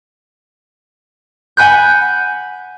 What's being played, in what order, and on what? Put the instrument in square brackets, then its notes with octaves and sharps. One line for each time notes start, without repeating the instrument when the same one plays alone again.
[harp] F#5 G#5 B5 F#6 G6